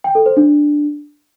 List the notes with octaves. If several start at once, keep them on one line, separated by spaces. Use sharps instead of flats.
G5
A4
C5
D4